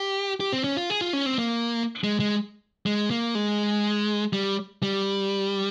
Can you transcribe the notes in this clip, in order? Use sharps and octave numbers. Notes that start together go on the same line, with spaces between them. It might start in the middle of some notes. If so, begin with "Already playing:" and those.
Already playing: G4
G4
C4
C#4
F4
G#4
F4
C#4
C4
A#3
G#3
G#3
G#3
A#3
G#3
G3
G3